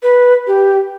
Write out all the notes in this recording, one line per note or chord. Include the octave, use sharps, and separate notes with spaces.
B4
G4